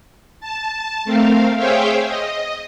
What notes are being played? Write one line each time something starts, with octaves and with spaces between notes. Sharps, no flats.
A5
A3 C4 A#4 F5
G#4 C5 C#5 E5 F5 G5
D#5